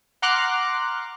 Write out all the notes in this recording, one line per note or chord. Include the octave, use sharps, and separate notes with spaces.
F#5 A#5 C6 D6 F6 F#6